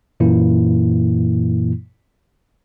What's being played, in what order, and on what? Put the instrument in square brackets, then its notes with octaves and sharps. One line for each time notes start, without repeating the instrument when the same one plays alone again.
[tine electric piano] F#2 A#2 E3 A#3 E4